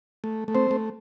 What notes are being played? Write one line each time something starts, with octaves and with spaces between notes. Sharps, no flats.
A3
A3
C4 C5
A3